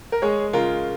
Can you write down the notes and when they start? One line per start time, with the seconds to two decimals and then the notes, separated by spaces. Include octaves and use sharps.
0.12 A#4
0.22 G#3 G#4 C#5
0.53 C#3 F4 A#4